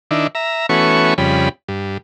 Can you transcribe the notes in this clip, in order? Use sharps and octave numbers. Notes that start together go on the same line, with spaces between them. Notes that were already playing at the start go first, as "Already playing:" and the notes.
D#3 D4 E4
E5 A#5
E3 A3 B3 C#4 F#4 C#6
F2 C#3 G3 B5
G2